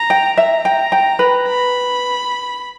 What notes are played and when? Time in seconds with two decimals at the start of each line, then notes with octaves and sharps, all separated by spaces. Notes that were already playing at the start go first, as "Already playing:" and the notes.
Already playing: A#5
0.10 G5
0.37 E5 A#5
0.65 G5
0.92 G5
1.19 B4
1.47 B5